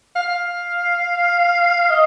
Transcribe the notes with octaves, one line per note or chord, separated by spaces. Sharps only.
F5
D#5